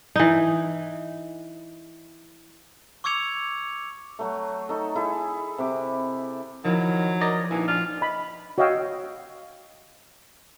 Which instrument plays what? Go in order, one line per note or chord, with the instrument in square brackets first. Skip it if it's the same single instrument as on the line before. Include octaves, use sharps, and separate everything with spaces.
[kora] E3 D#4
[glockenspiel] C#6 D6 E6 G#6 C#7 F7
[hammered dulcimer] F#3 A3
D#4 A4
E4 G#4 A4
C3 D6
[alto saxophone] D#3 [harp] F3 E4 [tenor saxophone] F#3
[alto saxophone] A#4 [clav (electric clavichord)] D5 D#5 A#5
[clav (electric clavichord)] A#1 [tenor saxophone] E3 [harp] D#4 G#5 [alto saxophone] E4
[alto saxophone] D4 [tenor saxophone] F4
[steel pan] D#5 B5
F#4 C#5 D#5 F5 G5 E6